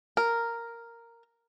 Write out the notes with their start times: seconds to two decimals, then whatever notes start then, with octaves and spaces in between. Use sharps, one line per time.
0.17 A#4